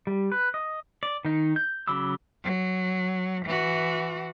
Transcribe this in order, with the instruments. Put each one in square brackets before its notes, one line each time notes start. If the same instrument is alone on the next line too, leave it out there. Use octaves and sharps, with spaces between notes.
[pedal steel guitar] G3
B4
D#5
D5
D#3 D#4
G6
C#3 F#3 B5 D6 E6
[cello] F#3
E3 F#4